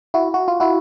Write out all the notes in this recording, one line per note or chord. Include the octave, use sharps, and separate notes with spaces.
E4 F#4
F#4
F4
E4 F#4